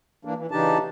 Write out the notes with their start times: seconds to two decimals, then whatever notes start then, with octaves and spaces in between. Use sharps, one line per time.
0.25 E3 A#3 D4
0.38 E3
0.51 C#3 E3 D4 D#4 G4 A5